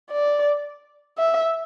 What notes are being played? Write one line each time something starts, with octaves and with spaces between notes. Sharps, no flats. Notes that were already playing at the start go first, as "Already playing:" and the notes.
D5
E5